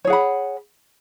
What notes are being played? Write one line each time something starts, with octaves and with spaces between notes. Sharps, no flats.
G#4 C#5 F#5 B5